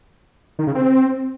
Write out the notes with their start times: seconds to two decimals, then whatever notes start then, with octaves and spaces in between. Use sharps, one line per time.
0.59 D#3
0.67 C#3
0.75 C4